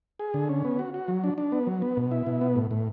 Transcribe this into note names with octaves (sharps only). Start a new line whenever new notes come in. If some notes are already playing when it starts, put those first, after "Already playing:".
G#4
D3
C#4
B3
F#4
F#4
F#3
D4
D4
B3
F#3
B3
B2
E4
B2
B3
A2
A2